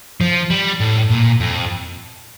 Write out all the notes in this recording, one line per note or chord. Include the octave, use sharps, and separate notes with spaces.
F3
G3
A2
A#2
F2